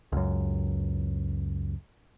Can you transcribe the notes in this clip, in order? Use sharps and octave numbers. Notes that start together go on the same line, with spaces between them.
C#2 F#2